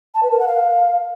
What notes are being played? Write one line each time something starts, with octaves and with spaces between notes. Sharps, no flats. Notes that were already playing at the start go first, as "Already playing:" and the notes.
A5
B4
A#4
F#5
F5